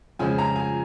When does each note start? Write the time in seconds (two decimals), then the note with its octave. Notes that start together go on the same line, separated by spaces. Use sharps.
0.19 F2 C#3 F3 G#3 G#5
0.38 A#5
0.56 G#5